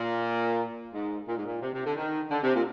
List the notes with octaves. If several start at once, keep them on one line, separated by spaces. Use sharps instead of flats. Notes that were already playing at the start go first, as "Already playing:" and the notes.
Already playing: A#2
G#2
A#2
G#2
A#2
C3
C3
D3
D#3
D3
C3
A#2